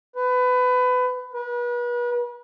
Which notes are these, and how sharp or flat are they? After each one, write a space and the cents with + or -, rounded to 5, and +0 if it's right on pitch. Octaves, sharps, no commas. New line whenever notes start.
B4 +25
B4 -35